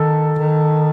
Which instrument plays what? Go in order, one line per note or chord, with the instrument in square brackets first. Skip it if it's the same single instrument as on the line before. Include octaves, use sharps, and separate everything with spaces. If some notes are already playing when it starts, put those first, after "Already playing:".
Already playing: [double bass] D#3 [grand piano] A4
[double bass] D#3